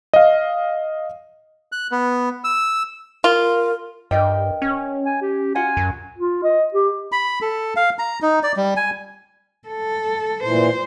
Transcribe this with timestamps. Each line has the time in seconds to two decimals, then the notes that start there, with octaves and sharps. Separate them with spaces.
0.14 D#5 F5
1.72 F#6
1.92 B3
2.44 E6
3.24 F4 A#4
4.11 G2 A#4 D#5 G5
4.62 C#4
5.06 G#5
5.22 G4
5.55 F4 F#4 F#5 G#5
5.77 F#2
6.18 F4
6.43 D#5
6.74 G4
7.12 B5
7.42 A4
7.76 F5
7.99 A#5
8.22 D#4
8.43 D5
8.56 G3
8.77 G#5
9.68 A4
10.43 A#2 E3 C5